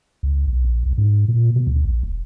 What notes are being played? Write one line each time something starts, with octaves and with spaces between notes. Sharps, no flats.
C#2
B1
A#1
C2
G#2
A#2
B2
D2
A#1
D#1